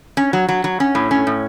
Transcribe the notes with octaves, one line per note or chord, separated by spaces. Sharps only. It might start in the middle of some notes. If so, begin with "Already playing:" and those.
C#4
F#3
F#3
F#3
C#4
A2
C#4
A2